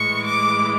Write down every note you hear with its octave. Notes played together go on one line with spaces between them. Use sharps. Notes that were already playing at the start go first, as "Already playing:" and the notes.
Already playing: A2 E3 G#3 C#6
D6